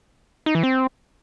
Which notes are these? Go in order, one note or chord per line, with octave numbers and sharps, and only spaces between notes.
D#4
E3
C4